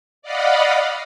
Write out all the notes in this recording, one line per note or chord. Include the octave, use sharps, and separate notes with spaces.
D5 D#5 F5 F#5 B5